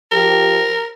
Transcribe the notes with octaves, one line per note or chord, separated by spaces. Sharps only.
F3 G4 A#4